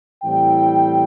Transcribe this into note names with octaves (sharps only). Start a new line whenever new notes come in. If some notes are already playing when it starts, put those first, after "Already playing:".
A2 E3 G3 C4 G5